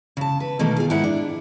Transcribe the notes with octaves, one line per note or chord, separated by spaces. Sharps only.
C#3 A5
B4
B2 D#3 A3 A#3
F4 G#4
G#2 E4 F#5
D4